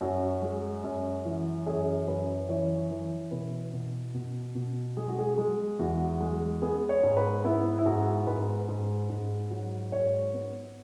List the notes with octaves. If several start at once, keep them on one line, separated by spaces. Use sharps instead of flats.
F#2 F#4
G#3
F#2
E3
F#2 G#4
F#2 B4
E3 C#5
E3
B2 B4
B2
B2
B2
G#3 G#4
F#4
G#4
G#3
E2 F#4
G#3
B3 G#4
C#5
G#2
B4
B3 E4
E4
G#2 F#4
G#2 B4
G#2
G#2
F#3
G#2 C#5
B3